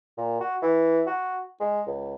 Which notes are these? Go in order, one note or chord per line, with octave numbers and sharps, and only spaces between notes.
A#2
F#4
E3
F#4
G#3
C#2